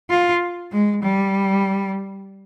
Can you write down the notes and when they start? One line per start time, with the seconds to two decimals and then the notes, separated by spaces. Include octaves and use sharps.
0.10 F4
0.72 G#3
1.03 G3